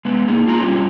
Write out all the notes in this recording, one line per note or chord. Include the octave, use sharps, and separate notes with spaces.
G#3 B3
A#3 D#4 G#4
F4 G#4 A#5
G3 G#3 C4 C#4 F4